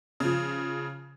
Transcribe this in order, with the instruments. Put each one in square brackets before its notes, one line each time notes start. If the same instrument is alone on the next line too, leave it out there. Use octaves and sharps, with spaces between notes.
[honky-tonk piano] C#3 F3